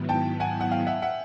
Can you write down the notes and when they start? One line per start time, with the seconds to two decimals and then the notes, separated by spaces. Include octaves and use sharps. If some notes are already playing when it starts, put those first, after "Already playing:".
Already playing: G#2 D#3 F#3 B3 E4
0.09 G5 A5
0.40 F#5 G#5
0.61 F#5
0.71 F5 G5
0.87 E5 F#5
1.02 E5 F#5